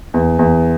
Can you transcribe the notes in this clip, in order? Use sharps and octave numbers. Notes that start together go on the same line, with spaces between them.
E2
E2